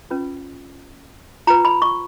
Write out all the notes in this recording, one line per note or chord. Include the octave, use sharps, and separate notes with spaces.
C#4 F4 B4
F4 B4 A#5
B5
C#6